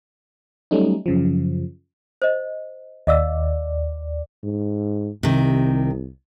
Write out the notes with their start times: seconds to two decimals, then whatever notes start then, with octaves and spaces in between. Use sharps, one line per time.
0.71 F#3 G3 A3 C#4 D#4
1.06 F#2 C#3 F3
2.22 C5 D#5
3.07 D#2 D5 D#5 F5 E6
4.44 G#2
5.23 C2 C3 D#3